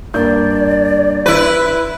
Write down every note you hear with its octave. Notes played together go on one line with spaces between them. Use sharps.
G2 A#3 D5 G6
E4 B4 B5